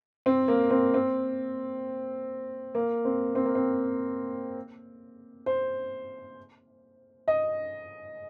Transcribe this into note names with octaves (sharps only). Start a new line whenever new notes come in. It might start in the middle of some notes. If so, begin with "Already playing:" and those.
C4
A#3
C4
C4
A#3
C4
C4
A#3
C4
C5
D#5